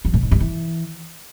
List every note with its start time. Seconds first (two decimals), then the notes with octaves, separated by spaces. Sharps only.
0.05 F3
0.14 A2
0.23 G#2
0.31 G2
0.40 E3